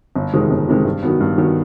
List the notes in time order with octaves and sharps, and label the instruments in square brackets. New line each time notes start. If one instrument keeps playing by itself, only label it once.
[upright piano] G1
F2 C3 D#3 G#3
G1
F2 C3 D#3 G#3
G2
D#3 F#3 B3
G2
D#3 F#3 B3